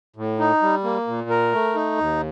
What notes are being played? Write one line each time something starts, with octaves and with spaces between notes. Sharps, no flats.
A2
D#4
G3
A#3
A#2
A#4
A3
D#4
D#2